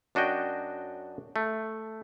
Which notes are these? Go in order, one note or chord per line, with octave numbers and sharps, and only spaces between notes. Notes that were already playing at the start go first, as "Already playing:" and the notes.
F#2 D4 F#4 D#5 G5
A3